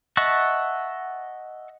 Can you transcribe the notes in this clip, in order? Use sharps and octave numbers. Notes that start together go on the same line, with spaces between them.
D#5 E5 F#5 A5 C#6